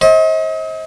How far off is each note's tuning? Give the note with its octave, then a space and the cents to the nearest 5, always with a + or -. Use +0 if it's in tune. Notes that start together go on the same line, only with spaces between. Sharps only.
C5 +45 D#5 +40